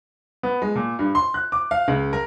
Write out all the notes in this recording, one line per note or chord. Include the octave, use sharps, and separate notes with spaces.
B3
G#3
A#2
G2
C6
F#6
D6
F5
C#2
A#4